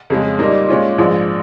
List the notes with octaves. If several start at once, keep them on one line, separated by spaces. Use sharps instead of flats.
F2 C#3 G#3
A#2 G3 A#3 D#4
A#2 G#3 C#4 F4
A#1 G#2 F3 G#3